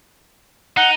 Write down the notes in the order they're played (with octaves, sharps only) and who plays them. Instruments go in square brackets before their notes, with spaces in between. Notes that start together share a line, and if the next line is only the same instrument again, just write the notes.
[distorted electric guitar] D#4 [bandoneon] F#5